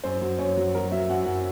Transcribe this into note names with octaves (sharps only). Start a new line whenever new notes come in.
F#2 C5
F#3
F#2 C#5
F#3
F#3 A#4
F#3 E5
F#2 F#5
F#2 F#5